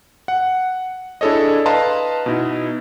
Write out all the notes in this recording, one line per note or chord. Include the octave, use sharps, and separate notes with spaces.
F#5
D4 E4 G#4 A4 C#5 D#5
B4 D#5 F5 A5 A#5 C6
B2 D#4 E4